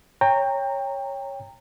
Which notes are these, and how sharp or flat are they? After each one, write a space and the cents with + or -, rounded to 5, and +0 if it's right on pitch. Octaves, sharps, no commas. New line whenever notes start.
C#5 +0 G5 +20 A#5 -20